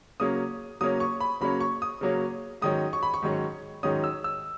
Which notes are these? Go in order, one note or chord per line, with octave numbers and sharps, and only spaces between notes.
C#3 F#3 A#3 C#4 D#6
C#3 F#3 A#3 C#4 D#6
C#6
B5
C#3 F#3 A#3 C#4 B5
C#6
D#6
C#3 F#3 A#3 C#4
G#2 D#3 F#3 C#4 D#6
C#6
B5
C#6
G#2 D#3 F#3 C#4
G#2 D#3 F#3 C#4 D#6
E6
E6